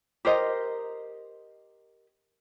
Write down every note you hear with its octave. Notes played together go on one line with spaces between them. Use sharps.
G4 A#4 C5 D#5